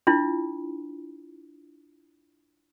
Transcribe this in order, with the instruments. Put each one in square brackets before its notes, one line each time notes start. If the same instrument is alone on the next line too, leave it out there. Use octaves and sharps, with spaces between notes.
[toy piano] D4 E4 F4